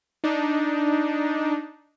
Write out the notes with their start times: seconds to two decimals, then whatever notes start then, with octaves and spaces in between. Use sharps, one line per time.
0.24 D4 D#4